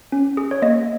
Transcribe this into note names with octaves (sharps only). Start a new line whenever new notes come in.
C#4
G#4
C#5
A#3 D#5